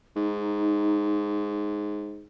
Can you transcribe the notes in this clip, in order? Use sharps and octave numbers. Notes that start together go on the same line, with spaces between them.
G#2 D#4